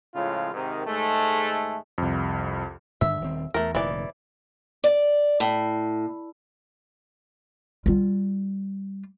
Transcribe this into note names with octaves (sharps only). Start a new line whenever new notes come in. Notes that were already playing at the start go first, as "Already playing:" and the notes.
A2 C#3 F3 G#3 F4
G#2 C3 D#3
D#2 G#2 G#3 A3
C2 F2
G2 D3 D#3 E5
D#1 D#3 C4
E2 A3 A#4
F1 A#2 D#3 E3 D5
D5
A2
G3 F4